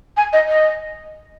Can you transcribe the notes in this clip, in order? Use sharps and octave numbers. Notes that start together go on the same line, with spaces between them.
G#5
D#5
D#5